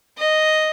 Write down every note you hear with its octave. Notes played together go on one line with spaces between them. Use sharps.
D#5